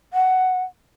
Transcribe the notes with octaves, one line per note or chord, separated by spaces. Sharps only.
F#5